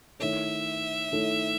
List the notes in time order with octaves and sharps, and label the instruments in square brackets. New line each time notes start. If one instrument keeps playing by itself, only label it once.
[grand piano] D#3 A3 E4 A4 C#5 [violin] E5
[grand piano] D#3 A3 E4 A4 C#5